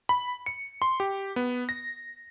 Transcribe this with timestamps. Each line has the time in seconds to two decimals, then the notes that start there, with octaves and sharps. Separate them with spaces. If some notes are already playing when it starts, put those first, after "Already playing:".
0.09 B5
0.46 C#7
0.82 C6
1.00 G4
1.36 B3
1.69 A#6